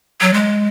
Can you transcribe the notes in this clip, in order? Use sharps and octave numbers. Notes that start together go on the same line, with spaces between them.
F#3
G#3